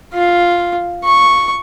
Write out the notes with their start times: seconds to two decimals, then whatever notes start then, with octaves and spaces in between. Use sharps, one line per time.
0.14 F4
1.04 C#6